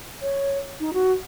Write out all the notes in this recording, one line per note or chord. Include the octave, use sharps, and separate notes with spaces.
C#5
D#4
F#4